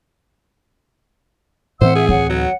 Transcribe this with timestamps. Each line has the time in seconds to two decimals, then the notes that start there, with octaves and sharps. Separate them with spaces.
1.81 A2 E3 C4 C5 E5 F#5 E6
1.95 G#4
2.09 D2 C#5 F#5
2.30 F#3